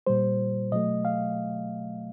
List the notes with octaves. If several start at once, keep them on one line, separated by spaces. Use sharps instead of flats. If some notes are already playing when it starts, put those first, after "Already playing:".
A#2 G3 C5
B2 F#3 A3 D#5
F5